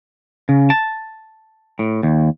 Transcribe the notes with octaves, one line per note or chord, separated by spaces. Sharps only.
C#3
A5
A2
D#2